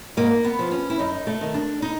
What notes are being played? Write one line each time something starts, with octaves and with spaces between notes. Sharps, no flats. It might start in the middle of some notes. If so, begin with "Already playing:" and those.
G#2 A#3
B3
F3
C#4
E4
F#2 D#4
A3
D#3
D4
D#4